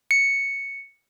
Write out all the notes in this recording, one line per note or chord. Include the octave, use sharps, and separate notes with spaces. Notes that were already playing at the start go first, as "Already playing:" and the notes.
C#7